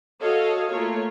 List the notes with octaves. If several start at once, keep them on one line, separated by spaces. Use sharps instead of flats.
F#4 A4 C#5 D#5 F5
A3 A#3 F4 C#5